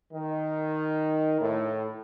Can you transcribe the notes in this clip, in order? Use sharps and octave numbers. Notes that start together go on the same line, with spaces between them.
D#3
A2